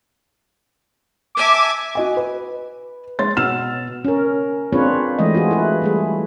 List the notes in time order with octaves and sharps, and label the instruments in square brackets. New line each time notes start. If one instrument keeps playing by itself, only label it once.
[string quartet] E5 G#5 A5 [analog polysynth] D6
[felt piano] F#4 D#5 G#5
B4
G#3 C#5 C6 A6
B2 B3 E6 F6 E7
[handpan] C#4 A#4
C4 D4 F4 G#4 B4 C#5
E3 G#3 A3 D#5
F4 F#4 G#4
E4 B4
G3 A3 G#4